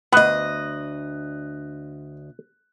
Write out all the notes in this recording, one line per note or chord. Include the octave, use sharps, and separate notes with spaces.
D2 B3 D#5 F#6